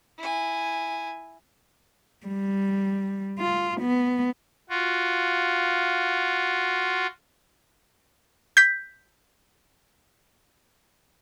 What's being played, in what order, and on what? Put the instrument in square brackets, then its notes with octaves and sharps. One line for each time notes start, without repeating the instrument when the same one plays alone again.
[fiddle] E4 G#5
[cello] G3
F4
B3
[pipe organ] F4 F#4
[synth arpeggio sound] G6 B6